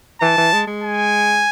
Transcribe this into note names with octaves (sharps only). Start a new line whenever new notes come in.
E3 A5
E3
G#3
G#3
G#5